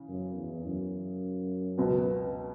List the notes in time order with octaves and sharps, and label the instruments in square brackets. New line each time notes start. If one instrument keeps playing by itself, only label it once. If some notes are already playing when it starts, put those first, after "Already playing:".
Already playing: [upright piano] C#3 E3
[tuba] F#2
E2
F#2
[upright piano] C#2 B2 F#3 B3